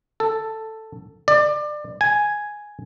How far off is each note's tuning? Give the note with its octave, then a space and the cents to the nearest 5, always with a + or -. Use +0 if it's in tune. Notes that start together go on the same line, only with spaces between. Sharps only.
A4 +5
D5 +25
G#5 +0